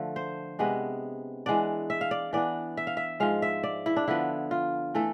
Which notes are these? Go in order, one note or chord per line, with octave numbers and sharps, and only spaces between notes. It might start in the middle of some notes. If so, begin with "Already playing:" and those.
Already playing: D3 F3 A3
C5
C3 G#3 B3 D4
E3 G#3 B3 D4 D5
E5
F5
D5
E3 B3 D4 D5
E5
F5
E5
G#2 F3 G#3 F5
E5
D5
E4
D4
D3 F3 B3 E4
F4
E3 A3 A4